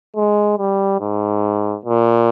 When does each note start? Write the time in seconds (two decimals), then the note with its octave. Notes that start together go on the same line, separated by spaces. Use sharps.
0.16 G#3
0.58 G3
1.00 G#2
1.85 A#2